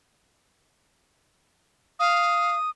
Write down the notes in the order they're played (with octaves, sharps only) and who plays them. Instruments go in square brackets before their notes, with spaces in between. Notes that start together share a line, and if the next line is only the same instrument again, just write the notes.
[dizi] F5 [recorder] D#6